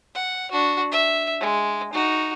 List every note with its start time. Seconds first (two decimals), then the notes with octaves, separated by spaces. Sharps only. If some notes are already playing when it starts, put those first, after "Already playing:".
0.15 F#5
0.51 D4 F#4
0.92 E5
1.40 G#3
1.93 D#4 F#4